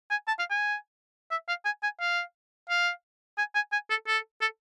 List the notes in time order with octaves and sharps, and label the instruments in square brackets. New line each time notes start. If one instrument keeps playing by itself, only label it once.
[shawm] G#5
A5
F5
G#5
E5
F5
G#5
G#5
F5
F5
G#5
G#5
G#5
A4
A4
A4